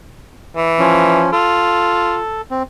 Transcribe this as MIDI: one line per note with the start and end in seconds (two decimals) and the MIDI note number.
0.56 1.22 52
0.79 1.31 53
0.79 1.31 61
1.32 2.20 65
1.32 2.41 69
2.51 2.63 60